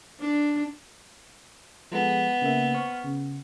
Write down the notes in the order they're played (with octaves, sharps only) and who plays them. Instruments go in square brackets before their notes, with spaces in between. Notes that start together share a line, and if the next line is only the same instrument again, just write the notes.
[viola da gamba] D4
[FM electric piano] F3 G#3 A4 [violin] B3
[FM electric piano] C#3 A#3 E5
C5 C#6 F6
C#3